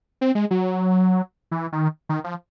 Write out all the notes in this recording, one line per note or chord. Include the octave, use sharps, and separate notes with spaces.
C4
G#3
F#3
E3
D#3
D#3
F3